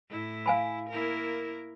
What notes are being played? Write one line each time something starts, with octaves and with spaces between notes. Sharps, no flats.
A2 E4
F5 G#5 B5
A#3 E4 A#4